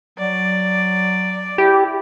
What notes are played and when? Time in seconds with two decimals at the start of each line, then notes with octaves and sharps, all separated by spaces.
0.19 F#3 D5
1.58 E4 G4